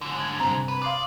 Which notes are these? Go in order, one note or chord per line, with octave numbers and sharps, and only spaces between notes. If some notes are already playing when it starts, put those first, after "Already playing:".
G#2 D3
G#6 A6
G2 C3 C4 A#5
B4
D5 F5 C6 D#6